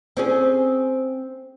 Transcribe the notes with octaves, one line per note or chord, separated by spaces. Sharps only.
C4 C#4 G#4